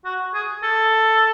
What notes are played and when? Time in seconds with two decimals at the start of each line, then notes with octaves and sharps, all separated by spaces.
0.05 F#4
0.34 G#4
0.63 A4